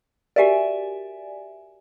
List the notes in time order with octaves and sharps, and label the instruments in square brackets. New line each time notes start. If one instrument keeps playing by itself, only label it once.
[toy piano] F#4 G4 A#4 [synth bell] D5 E5 G#5